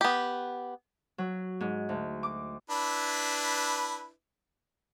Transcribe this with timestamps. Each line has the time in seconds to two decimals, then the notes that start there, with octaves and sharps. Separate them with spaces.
0.01 B3 G4
1.18 F#3
1.61 G#2
1.89 D2
2.23 D6
2.70 D4 E4 B4